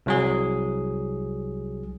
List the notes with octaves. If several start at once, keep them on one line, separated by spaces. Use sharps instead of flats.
C2 F#3 G#4